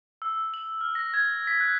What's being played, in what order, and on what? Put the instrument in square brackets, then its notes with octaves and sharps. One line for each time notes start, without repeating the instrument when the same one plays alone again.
[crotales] E6
F#7
F6
A#6
G#6
B6
F#6